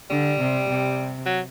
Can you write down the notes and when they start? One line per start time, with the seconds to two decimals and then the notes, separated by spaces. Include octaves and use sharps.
0.10 D3 G3
0.39 C3
0.68 C3
1.26 F#3